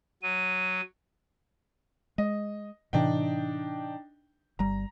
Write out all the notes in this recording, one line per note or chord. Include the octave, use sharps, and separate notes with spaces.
F#3 D#7
G#3 D#5
A2 C3 E3 D4 D#4 G5
G1 G3 A#5